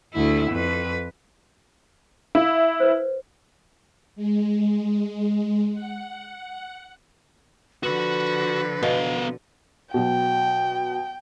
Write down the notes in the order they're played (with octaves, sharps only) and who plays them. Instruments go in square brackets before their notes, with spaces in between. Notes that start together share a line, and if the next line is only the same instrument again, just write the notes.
[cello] D2 E4
F2 B4
[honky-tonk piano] E4 [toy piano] F5
[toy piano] B4 C5
[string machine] G#3
F#5
[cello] D3 F3 [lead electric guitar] F#4 [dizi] B4
[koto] B2 [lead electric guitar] B3 F5
[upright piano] B2 F#3 [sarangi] G5